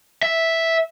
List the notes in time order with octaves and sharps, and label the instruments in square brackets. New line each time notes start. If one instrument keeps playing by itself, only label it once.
[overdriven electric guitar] E5